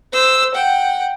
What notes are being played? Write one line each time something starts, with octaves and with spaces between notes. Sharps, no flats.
C5 E6
F#5 G5